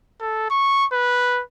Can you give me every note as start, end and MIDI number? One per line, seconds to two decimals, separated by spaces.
0.20 0.46 69
0.50 0.86 85
0.93 1.42 71